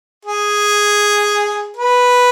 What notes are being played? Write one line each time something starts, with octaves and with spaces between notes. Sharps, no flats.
G#4
B4